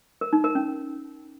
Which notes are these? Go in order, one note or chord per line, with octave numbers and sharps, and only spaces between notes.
A#4
D#4
A#4
C#4